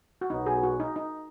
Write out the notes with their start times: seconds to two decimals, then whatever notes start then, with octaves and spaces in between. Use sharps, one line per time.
0.21 F#4
0.29 B1 B2 F#3 B3 D#4
0.46 G#4
0.63 F#4
0.80 D#4
0.96 D#4